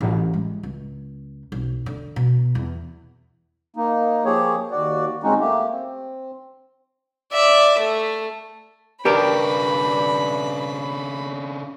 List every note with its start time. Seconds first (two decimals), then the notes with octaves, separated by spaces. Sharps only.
0.01 A1
0.33 G#3
0.63 C#2
1.52 B1
1.86 D3
2.16 B2
2.55 E2
3.76 A#3 D#4
4.25 F3 A#3 G4 G#4 C#5
4.71 D#2 F#4 D5
5.23 D#2 G#3 C4 C#4 D#4 F#4
5.40 A3 A#3 G4
5.71 C4
7.33 D5 E5
7.79 A3
9.05 G2 C#3 D4 G4 A#4 B5